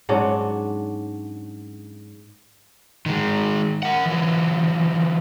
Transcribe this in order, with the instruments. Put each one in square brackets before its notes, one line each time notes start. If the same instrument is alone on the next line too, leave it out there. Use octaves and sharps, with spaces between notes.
[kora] G#2 F#3 C#4 D4
[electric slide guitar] D#3 G#3
A#4 F#5
E3 F#3